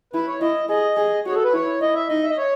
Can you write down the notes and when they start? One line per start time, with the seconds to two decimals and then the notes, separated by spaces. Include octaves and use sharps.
0.13 E4 B4
0.27 C#5
0.41 E4 D#5
0.69 G#4 D#5
0.97 G#4
1.26 F#4 C#5
1.30 G#4
1.35 A4
1.44 B4
1.53 E4 C#5
1.81 E4 D#5
1.95 E5
2.09 D#4 D#5
2.23 E5
2.30 D#5
2.38 C#5